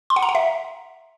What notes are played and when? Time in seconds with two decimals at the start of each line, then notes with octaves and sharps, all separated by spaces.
0.10 C6
0.16 F#5
0.22 A#5
0.29 F#5
0.35 E5